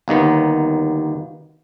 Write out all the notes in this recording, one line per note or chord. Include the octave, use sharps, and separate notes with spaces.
G1 D#2 D#3 B3